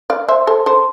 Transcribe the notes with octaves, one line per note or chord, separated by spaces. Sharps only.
D5 F5
C5 E5
A4 C5
A4 C5